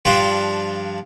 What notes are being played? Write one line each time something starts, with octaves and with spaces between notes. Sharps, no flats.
G2 F3 D4 C5 G5